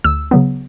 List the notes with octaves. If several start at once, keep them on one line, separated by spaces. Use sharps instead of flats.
D2 E6
C#3 F#3 B3